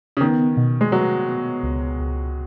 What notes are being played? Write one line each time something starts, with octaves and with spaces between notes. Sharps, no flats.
C#3
D#3 B3
B2
G#3
F#3 B3
B3
C#2
C#2